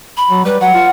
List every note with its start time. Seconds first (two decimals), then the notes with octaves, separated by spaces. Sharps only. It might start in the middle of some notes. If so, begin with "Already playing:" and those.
0.17 B5
0.30 F#3
0.45 G3 B4
0.61 F#3 F#5
0.74 F4